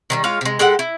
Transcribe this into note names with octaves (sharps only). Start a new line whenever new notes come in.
D#3 F#3 G3
G#3 F4 C#5 F5
C3 G#3
G#3 G4 A4 F#5
E4